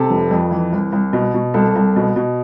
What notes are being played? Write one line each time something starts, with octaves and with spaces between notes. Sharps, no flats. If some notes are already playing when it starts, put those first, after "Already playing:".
Already playing: C3 A4
F1
F2
E3
C2
C2
B2
B2
C2 A4
C2
B2
B2